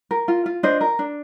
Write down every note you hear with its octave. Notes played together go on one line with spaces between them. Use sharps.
A#4
F4
F4
D4 C5 D#5
A#4
D4